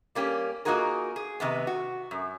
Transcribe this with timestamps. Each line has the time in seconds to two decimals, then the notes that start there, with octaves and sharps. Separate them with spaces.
0.15 G3 A#3 C#4 G4
0.65 A#3 D#4 F4 F#4 G#4 A#4
1.16 G#4
1.40 C3 D#3 B3
1.67 F#4
2.11 F#2